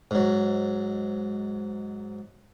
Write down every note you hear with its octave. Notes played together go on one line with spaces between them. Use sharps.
G#2 F#3